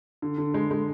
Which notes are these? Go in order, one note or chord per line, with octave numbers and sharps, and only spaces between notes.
D3
D3
G#3
G#3